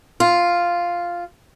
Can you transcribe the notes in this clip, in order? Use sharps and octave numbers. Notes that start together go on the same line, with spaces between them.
F4